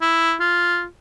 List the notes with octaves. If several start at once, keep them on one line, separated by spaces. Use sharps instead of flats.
E4
F4